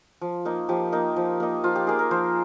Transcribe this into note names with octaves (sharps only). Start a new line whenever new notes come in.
F3
A#3 D#4
F3 G4
A#3 D#4
F3
A#3 D#4
F3 F4
G4
A#3 D#4 G#4
A#4
F3 C5